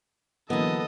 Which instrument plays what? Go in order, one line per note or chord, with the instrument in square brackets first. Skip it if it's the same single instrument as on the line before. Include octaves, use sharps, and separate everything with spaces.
[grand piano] D3 E3 F#3 [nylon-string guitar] A#3 B3 [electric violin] A4 D#5